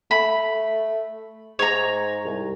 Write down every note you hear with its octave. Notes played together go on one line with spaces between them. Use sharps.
A3 B5
G#2 C#5 A#5
C2